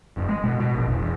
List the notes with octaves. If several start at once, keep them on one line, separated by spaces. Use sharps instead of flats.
F#1
G#3
B2
B2
A#1
E1
E2